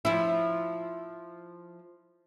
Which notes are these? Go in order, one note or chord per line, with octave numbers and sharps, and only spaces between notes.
F3 E4